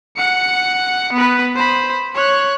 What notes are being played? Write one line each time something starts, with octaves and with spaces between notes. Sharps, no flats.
F#5 C#7
B3 B4
C5 B5
C#5 F#6